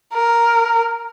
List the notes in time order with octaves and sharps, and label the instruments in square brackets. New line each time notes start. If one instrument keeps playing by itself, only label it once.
[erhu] A#4